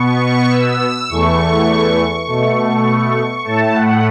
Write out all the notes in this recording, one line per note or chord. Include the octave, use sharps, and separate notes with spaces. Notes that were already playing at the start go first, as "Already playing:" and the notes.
Already playing: B2 B3 C#6
E6
E2 E3 A3 C#6
B2 A3
A2 A3 A5
F#5